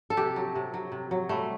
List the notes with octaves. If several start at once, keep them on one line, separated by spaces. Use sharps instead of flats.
A4
C3 G4
F#3
C3
F#3
C3
F#3
G3 A3